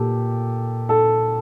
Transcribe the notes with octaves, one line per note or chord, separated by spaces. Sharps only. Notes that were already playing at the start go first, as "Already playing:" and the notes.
Already playing: A#2 G4 A4
A4